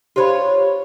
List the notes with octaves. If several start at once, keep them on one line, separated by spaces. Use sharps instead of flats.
F4 G4 C5 C#5 B5